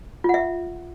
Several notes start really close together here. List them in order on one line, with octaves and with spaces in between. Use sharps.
F4 F#5 E5